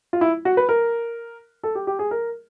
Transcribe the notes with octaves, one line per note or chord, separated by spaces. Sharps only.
F4
E4
F#4
B4
A#4
A4
G4
G4
G#4
A#4